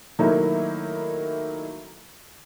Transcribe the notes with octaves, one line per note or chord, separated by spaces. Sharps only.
D#3 F#3 A3 A#3 D#4 E4